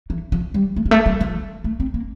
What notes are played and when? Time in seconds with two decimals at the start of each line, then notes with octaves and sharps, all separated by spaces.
0.10 E3
0.32 F3
0.54 G3
0.76 A3
0.86 G3
0.91 A3
1.06 G3
1.21 F3
1.64 A3
1.80 C4
1.94 A#3